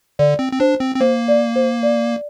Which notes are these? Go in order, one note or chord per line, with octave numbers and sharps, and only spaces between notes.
D3 D5
C4
C4
D4 C5
C4
C4
A#3 C5
D5
C5
D5